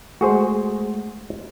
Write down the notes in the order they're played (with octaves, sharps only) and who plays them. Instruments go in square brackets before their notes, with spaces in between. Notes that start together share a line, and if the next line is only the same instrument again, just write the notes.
[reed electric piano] G#3 A3 [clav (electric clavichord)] F#4 G#4 C5